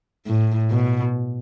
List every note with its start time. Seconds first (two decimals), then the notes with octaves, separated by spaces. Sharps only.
0.27 A2
0.71 B2